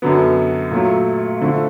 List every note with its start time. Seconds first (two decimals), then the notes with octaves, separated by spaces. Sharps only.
0.02 F#2 D3 F#3 B3
0.71 A#2 F#3 A3
1.41 D3 F3 A3